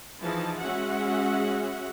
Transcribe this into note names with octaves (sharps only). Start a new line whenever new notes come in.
E3 F3 D#4 E4 G#4 A5
G#3 C#4 F#4 G#4 E5 F#5